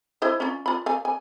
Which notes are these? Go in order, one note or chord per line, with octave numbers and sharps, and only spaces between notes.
E4 C5 D#5
C#4 F4
F4 B5
F5 G#5
G#5